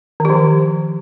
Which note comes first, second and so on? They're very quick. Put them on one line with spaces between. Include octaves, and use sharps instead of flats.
D#3 G4 F3